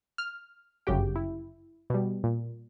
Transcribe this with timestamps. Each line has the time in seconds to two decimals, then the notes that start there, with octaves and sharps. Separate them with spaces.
0.18 F6
0.87 G1 F#2 C#3 F#4 G4 G5
1.16 E4
1.90 B2 G3
2.24 A#2